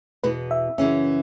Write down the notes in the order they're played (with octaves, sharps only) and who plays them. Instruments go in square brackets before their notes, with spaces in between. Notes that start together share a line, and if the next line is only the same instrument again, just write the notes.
[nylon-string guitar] E2 B2 B3 [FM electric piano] B4
[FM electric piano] E5
[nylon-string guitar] F#2 C#3 E3 C#4 [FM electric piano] E5